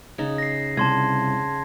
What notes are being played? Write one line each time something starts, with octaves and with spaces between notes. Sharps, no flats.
C#3 D#4
A#6 C7
C2 A5 C6 G#6